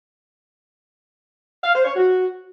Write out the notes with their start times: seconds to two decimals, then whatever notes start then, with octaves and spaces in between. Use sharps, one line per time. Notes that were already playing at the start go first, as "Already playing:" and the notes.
1.64 F5
1.74 C5
1.85 C#5
1.95 F#4